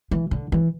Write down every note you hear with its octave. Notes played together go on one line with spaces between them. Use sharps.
E3
D3
E3